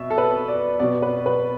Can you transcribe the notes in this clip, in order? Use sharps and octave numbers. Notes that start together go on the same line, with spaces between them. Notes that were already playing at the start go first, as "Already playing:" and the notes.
Already playing: B2 E5
A4
B4
D5
B2 B3 D5
B4
B4